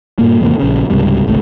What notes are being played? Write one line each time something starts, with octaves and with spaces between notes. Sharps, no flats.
G2 A#2 A#3
E2 G#2 C3 A#3
A#1 C#3
C#2 G#2 C3 G3
G#1 C#2 C3 A3